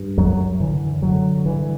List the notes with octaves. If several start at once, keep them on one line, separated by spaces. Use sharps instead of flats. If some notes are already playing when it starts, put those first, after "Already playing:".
Already playing: G2
F#2 F#3
D3 E3
D3 F#3
G2 E3